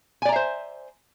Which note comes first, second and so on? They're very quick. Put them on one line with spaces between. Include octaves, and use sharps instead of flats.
G#5 D5 A#5 E5 C5